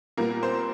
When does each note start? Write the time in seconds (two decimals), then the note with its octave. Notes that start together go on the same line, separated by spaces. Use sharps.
0.17 A#2 G3 A#3 B3 A#4
0.43 C4 C5